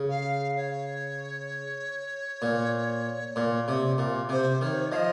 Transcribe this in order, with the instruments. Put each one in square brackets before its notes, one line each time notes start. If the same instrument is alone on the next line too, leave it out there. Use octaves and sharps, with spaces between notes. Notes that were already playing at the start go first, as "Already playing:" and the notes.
Already playing: [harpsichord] C#3
[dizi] F5
C#5
[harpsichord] A#2
A#2
C3
A#2
[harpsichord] C3 [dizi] C5
[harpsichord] D#3 [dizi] C#5
[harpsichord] F3 [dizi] D#5 F5